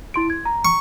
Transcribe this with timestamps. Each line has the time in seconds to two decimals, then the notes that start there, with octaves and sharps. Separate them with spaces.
0.14 E4 C6 D7
0.30 G#6
0.45 A#5
0.65 C#6